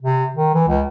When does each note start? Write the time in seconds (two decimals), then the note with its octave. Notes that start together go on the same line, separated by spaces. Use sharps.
0.02 C3
0.35 D#3
0.54 E3
0.68 C#2